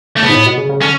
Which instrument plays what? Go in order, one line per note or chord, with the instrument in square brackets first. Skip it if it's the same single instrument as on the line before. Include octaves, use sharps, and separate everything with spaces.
[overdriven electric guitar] A3
[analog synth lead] C#3 [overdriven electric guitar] B3
[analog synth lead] G#2
A2
B2
C#3
C#3
[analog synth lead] D3 [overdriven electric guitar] C#4